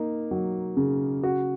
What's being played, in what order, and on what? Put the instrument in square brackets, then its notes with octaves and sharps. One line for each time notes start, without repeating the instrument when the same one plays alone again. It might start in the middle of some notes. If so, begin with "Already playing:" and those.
Already playing: [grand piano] A#3 D#4
F#3
C#3
F#4